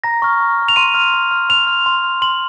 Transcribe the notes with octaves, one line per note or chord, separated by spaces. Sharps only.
A#5 A#6
C#6 F6
A#5
C#6 F6
F7
C6 D#7
F6
C6
F6
C6 F7
F6
C6
F6
C6 F#7